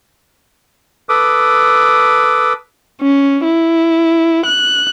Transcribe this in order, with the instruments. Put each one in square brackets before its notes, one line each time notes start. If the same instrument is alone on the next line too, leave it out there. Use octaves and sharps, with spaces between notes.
[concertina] A4 B4 D6 D#6
[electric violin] C#4
E4
F#6